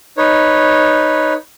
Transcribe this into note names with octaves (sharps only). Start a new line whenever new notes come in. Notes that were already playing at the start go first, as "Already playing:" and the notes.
D#4 B4 C#5